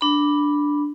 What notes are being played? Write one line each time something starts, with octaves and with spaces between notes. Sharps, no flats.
D4 B5